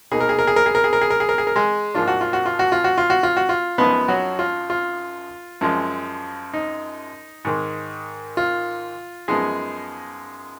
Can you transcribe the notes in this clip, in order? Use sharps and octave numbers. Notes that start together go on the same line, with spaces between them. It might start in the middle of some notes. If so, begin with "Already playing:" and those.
B2 A#3 D#4 G#4
A#4
G#4
A#4
G#4
A#4
G#4
A#4
G#4
A#4
G#4
A#4
G#4
A#4
G#4
A#4
G#3 G#4
G#2 F3 A#3 D4 F4
F#4
F4
F#4
F4
F#4
F4
F#4
F4
F#4
F4
F#4
F4
F#2 F3 G#3 B3 D#4 B4
F#3 F#4
F4
F4
F#2 F3 G#3
D#4
G#2 D#3 G#3
F4
F#2 F3 G#3 B3 D#4 G#4